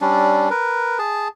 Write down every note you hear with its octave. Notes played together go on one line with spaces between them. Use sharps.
G3 C#4 D4
A#4 B4
G#4 A5